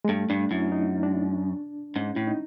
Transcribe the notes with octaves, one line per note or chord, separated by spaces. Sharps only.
G#3
G2 A3
G2 D4
F#2 E4
D#4
D4
G#2 C#4
A2 E4
D#4